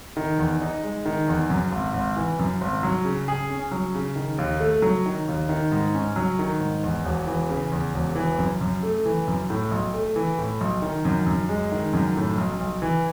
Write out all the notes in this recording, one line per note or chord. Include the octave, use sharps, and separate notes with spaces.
D#3
E2
D#4
G#3
D#3
E2
F#2
G#1
G#1
E3
F#2
G#1
F#3
C#3
G#4
C#4
F#3
C#3
D#3
D#2
A3
F#3
D#3
D#2
D#3
G#2
C#4
F#3
D#3
G#2
E2
E1
E3
C#3
E2
E1
E3
F#2
F#2
A3
E3
F#2
A2
B1
A3
E3
A2
B1
D#3
F#2
F#2
G#3
D#3
F#2
A2
B1
B1
E3